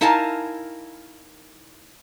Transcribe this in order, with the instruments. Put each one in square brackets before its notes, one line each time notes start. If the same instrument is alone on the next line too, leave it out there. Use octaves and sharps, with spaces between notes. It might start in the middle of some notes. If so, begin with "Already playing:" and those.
[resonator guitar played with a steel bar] D#4 E4 A#4 F5 G#5 A5